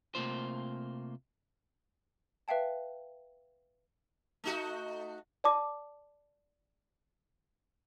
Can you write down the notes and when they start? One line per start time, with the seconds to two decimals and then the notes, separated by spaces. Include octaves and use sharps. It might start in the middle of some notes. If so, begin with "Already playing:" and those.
0.15 C3 E3 A3 A#3 F4 C5
2.48 B4 E5 F5 G5 A5
4.44 A3 D#4 F#4
5.44 D5 A5 D6